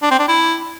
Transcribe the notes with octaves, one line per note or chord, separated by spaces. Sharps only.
D4
C4
D4
E4